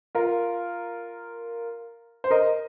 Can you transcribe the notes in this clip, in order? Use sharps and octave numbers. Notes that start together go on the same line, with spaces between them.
F4 A#4
C5
A#4 D#5